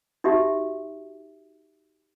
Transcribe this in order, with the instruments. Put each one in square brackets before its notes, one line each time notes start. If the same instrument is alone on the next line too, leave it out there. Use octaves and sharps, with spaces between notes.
[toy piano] D#4 F#4 G4 E5